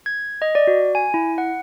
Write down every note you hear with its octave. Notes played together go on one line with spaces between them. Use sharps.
G#6
D#5
D5
F#4
G#5
E4
F#5